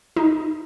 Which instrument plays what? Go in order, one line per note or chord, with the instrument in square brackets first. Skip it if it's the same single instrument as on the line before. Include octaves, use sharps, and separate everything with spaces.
[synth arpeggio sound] D#4